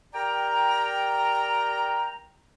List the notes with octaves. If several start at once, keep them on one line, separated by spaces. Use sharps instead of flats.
G4 A#4 D5 G5 A#5